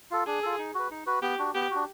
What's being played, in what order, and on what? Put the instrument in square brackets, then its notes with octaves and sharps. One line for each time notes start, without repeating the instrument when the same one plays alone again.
[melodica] F4 A4
[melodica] D4 [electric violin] G#4
[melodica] F4 A4
D#4
F#4 B4
D#4
F#4 B4
[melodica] B3 [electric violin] G4
[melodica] D4 F#4
[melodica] B3 [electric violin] G4
[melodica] D4 F#4